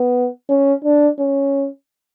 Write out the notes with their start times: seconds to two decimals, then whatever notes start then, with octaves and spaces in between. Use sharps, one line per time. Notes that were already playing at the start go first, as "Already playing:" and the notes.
Already playing: B3
0.49 C#4
0.84 D4
1.19 C#4